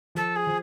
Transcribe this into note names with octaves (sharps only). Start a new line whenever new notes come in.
F3 A4
G#4
F3